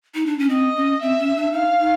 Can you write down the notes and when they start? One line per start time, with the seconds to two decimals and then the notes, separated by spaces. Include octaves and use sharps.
0.15 D#4
0.26 D4
0.39 C#4
0.49 C4 D#5
0.76 C#4
1.01 C4 E5
1.19 C#4
1.36 D4
1.52 D#4 F5
1.79 D#4